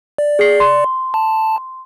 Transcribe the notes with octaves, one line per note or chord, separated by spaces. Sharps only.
D5
G#4 C7
C6
A5